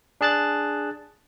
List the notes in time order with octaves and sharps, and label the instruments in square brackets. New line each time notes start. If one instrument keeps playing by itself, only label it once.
[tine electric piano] D4 G#4 A5 F#6 A6